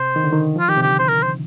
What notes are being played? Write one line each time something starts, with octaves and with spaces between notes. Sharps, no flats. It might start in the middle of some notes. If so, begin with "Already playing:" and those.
Already playing: C3 C5
D#3
D3
D#3
F3 F4
D#3 G4
C3
D3 G4
C5
A#4
C5